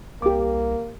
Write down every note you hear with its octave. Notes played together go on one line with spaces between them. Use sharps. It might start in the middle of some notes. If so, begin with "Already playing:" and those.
C2 A#3 G4 D6